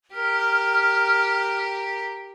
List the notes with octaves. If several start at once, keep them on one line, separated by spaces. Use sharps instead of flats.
G4 A#4 F6